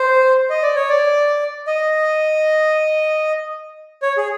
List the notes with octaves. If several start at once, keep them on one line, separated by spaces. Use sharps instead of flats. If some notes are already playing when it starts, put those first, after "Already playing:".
Already playing: C5
D#5
D5
C#5
D5
D#5
C#5
G#4